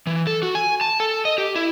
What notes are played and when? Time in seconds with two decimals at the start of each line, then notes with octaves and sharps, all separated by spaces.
0.07 E3
0.27 A4
0.43 F#4
0.55 G#5
0.81 A5
1.00 A4
1.25 D#5
1.38 G4
1.56 E4